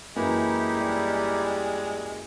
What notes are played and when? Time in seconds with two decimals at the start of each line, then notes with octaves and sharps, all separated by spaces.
0.16 F#2 E3 G#3 A#3 D#4 E4 G4
0.78 G3